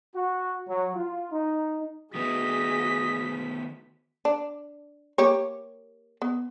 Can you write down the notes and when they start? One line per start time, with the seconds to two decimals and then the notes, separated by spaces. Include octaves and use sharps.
0.15 F#4
0.67 F#3
0.95 F4
1.31 D#4
2.15 D#3 A3 B3 F#4 G#4 D#5 B6
4.25 D4
5.18 A#3 G4 C#5
6.22 B3